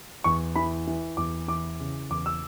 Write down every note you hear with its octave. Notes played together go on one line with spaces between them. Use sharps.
E2 C#6
E3 B5
E3
E2 D6
E3 D6
C#3
E2 D6
E6